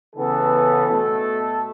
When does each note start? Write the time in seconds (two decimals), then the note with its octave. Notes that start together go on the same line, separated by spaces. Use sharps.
0.15 C#3 E3 B3 A4
0.87 B2 A3 A4